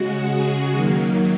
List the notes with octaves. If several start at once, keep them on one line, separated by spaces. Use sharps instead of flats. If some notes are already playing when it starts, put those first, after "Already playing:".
Already playing: C#3 G#3 F#4
G#4
D#3 F#3 A#3